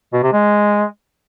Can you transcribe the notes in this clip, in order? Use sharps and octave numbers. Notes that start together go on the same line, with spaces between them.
B2
C3
G#3